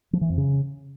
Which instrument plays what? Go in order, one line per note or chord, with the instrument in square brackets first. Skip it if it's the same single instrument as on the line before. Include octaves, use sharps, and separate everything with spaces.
[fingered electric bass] F3
E3
F2
C#3